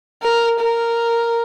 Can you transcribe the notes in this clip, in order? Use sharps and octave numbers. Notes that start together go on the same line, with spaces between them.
A#4
A#4